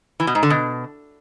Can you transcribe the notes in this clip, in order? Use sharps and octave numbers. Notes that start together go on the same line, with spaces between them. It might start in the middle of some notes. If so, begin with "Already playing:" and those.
E3
B2
G#2
D3
B2